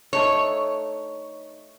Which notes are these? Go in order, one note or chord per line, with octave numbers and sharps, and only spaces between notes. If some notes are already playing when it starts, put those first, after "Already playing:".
A3 D4 D#4 C#5